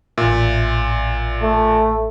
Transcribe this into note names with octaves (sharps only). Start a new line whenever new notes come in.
A1 A#2 E5
A3